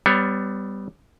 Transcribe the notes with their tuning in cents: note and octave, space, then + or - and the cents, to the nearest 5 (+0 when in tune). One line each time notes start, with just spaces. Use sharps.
G3 +0 B3 +30 C#5 +0